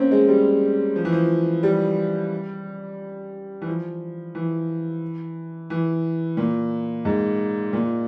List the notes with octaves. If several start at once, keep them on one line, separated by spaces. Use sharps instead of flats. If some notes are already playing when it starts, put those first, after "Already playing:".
Already playing: A#3 C4 C#4
G#3
G3
F3
E3
F3
G3
E3
F3
E3
E3
A#2
G#2
A#2